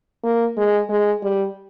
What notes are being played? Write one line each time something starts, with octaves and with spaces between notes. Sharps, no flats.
A#3
G#3
G#3
G3